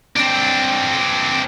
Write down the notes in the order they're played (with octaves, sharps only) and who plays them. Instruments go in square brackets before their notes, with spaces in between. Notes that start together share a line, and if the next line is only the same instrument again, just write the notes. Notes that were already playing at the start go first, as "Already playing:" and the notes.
[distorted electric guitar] C4 D4